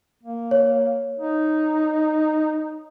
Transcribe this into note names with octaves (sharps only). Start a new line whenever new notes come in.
A#3
C#5
D#4